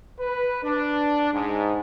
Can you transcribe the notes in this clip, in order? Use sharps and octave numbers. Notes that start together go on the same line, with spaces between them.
B4
D4
G#2